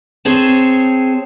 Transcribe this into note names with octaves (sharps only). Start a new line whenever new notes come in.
C4 G#4 C#5 A5